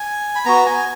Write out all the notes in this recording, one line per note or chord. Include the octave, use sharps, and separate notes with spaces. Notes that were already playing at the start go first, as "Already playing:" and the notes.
Already playing: G#5
B5
B3 F#4 A#5
G#5